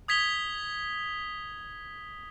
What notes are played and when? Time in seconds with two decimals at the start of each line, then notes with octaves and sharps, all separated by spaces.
0.08 D#6 G#6 B6 F7 G7